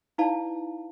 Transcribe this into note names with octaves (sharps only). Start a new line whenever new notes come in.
D#4 E4 B4 D5 F5 A5